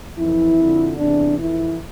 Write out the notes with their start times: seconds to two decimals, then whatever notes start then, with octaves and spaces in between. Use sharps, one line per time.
0.18 F2 E3 E4
0.58 F2 D3
0.98 E2 C3 E3 D4
1.38 F2 E3 E4